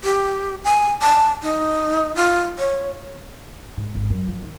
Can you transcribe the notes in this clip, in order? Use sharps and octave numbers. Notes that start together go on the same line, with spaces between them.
G4
G#5
A5
D#4
F4
C#5
G#2
G#1
F#2
F3
D#3